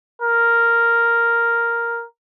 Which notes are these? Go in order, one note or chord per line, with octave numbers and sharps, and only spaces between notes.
A#4